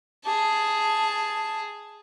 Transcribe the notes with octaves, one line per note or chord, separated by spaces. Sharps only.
G#4 A5